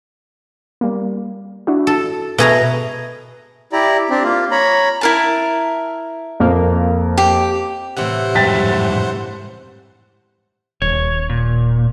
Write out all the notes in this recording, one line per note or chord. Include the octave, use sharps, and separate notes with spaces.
G3 A#3
D4 E4 F#4
A4
B2 G#4 A4 E5 A#5
E4 G4 D5 A#5
C4 D4 G4
A#3 F4
C#5 A#5 B5
E4 A#4 A5
F2 A#3
G4
A2 C3 E3 C5 F#5
F2 G#2 G3 G5 A6 B6
D#1 C#5
A#2